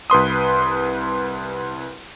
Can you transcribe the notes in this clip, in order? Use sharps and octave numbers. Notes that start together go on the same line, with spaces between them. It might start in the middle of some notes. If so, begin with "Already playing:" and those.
C2 B4 C6 D#6